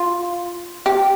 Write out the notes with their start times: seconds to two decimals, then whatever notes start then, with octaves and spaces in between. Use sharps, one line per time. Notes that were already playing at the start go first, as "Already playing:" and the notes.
Already playing: F4
0.86 G4